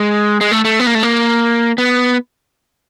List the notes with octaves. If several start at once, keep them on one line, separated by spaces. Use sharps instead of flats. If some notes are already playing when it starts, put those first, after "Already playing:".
Already playing: G#3
G#3
A3
A3
B3
A#3
A3
A#3
B3